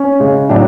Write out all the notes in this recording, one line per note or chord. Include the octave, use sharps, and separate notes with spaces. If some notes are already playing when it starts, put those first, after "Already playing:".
Already playing: C#4
C#3 G#3
A2 F#3 D4